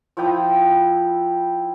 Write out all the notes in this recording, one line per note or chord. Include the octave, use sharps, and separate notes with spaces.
F3 E4 G5 D#6